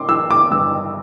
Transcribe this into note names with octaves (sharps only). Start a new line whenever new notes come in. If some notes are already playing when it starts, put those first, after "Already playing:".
Already playing: C6 D6
E3 E6
D6
G2 E6